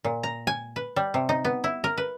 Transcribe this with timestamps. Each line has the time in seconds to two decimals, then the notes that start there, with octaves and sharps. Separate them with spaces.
0.05 A#2
0.23 A#5
0.47 G#5
0.76 B4
0.96 G3
1.14 C3
1.29 D#4
1.45 B3
1.64 E4
1.84 A#4
1.98 B4